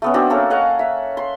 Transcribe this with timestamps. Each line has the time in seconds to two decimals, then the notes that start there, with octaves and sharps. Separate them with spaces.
0.02 A3 B3 C#4
0.14 C4 D4 F#4
0.30 A#3 C#4 A4 A#4
0.50 C#5 D#5 F5 F#5
0.79 E5
1.17 C6